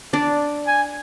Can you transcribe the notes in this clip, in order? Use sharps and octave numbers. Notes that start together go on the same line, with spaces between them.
D4 D5
G#5